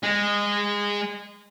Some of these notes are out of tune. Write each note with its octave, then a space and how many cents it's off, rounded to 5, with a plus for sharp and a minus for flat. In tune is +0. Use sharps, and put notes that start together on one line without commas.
G#3 -20